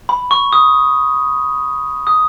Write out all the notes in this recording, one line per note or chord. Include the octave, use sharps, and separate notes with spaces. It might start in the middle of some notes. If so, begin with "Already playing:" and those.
B5
C#6
D#6
D#6